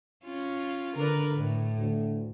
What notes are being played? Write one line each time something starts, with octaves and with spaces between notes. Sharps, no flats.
C#4 F4
D3 A#4 B4 D5
A2
D2